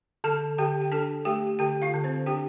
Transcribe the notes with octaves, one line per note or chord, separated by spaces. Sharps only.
D3 A4 A5
D3 G4 G5
G5
D4 A4 A5
A3 G4 G5
D3 G4 G5
F4 F5
D3
C4 C5
D4 G4 G5